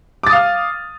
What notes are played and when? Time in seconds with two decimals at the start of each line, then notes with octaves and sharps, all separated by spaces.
0.23 D6
0.27 A6
0.30 D#6
0.33 F5
0.36 F6